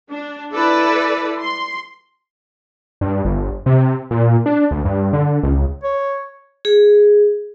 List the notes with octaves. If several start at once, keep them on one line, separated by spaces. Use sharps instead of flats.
D4
E4 A4 B4 D5
C6
G2
G1
C3
A#2
D4
D2
G2
D3
C#2
C#5
G#4